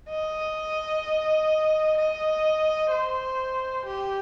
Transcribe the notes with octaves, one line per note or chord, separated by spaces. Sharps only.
D#5
D#5
C5
G4